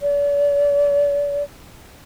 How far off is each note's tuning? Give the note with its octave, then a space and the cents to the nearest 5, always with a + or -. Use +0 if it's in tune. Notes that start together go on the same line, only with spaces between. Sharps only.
D5 -40